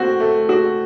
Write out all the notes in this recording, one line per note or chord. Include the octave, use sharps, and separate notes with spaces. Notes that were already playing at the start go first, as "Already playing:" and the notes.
Already playing: A3 C4 F#4
A3
F#4